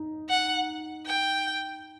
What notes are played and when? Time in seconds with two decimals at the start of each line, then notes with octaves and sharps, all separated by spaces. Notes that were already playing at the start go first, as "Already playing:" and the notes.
Already playing: D#4
0.30 F#5
1.06 G5